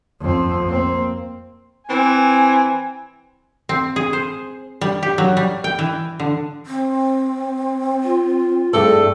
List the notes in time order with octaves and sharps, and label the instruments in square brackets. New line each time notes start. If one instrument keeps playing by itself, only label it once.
[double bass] F2 C4
A#3 C4
[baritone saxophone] E3 [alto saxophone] C4 [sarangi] G#5
[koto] C4
G#4
C5
G3
G4
F#3
G3
G5
E3
D3
[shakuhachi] C4
[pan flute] F4
[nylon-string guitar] G2 A3 D5 [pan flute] G#4 [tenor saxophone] A4